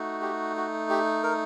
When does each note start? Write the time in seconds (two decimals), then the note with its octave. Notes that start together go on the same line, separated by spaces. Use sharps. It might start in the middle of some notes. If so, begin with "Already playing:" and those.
Already playing: A3 D#4 F#4
0.22 G4
0.57 F#4
0.90 G4
1.23 A#4